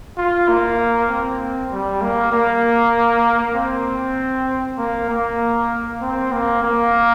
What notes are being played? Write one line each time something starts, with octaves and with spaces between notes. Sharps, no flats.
F4
A#3
C4
G3
A#3
A#3
C4
A#3
A#3
C4
A#3
A#3